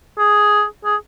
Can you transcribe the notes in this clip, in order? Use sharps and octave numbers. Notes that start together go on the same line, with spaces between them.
G#4
G#4